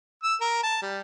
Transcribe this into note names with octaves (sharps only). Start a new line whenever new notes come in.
E6
A#4
A5
G3